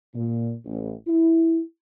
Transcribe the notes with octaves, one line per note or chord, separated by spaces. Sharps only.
A#2
A1
E4